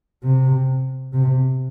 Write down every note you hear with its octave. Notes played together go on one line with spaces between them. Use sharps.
C3
C3